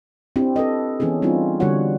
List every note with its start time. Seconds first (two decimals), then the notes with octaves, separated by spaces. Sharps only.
0.36 C4 D4 E4 G4
0.56 C4 A4 B4 D#5
1.00 E3 B3 C#4 E4 G#4
1.22 G3 C4 D4 D#4 F4
1.60 D3 G3 F#4 C#5 F#5